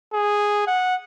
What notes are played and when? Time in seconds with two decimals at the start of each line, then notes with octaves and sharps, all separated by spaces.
0.14 G#4
0.67 F#5